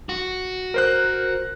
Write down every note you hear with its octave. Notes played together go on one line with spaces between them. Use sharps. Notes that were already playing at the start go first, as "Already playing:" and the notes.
F#4
A#4 C5 F#6